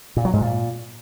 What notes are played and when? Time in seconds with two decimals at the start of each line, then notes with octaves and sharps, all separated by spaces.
0.17 A#2
0.25 F#3
0.33 G#2
0.42 A#2